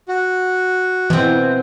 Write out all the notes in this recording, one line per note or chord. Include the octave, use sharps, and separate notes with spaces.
F#4
B2 E3 C4